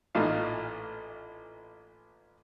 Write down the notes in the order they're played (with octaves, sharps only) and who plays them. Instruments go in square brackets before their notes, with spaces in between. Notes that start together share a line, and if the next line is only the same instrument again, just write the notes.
[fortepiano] A1 A#2 A3 D#4 F5